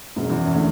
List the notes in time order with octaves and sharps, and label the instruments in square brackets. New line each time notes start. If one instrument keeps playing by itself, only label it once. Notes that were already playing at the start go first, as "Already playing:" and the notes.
[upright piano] E1 [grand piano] F#2
[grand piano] E2
F#2
[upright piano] D3 A3